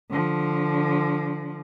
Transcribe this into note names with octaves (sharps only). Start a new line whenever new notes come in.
D3 F3